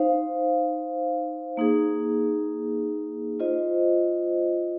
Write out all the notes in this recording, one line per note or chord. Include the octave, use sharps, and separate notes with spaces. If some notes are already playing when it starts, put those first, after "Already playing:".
Already playing: D#4 C5 F5
A#3 D#4 G#4
F4 C5 D#5